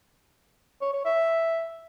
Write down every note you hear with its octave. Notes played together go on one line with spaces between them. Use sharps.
C#5
C#5
E5